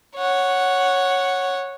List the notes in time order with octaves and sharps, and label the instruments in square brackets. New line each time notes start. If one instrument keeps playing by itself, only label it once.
[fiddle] C#5 F#5